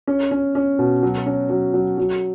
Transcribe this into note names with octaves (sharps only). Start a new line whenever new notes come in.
C#4
C#4
C#4
B2
F#3
C#4
F#3
F#3
F#3